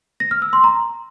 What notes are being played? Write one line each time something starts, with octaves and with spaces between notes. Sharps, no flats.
A#6
F6
E6
C6
A#5